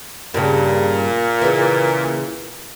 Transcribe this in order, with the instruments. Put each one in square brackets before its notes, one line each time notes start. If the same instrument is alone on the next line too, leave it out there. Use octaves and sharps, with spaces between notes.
[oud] G2 C#3 [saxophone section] A#2
[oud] C#3 E3